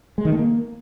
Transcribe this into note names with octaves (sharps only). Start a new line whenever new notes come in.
G#3
D#3
A3
A#3